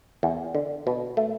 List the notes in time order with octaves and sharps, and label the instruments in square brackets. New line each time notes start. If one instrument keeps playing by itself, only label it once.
[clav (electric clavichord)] E2
D3
B2
A3